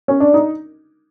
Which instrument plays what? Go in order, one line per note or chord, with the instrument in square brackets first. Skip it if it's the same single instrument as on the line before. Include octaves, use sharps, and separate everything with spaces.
[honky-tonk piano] C#4
D4
D#4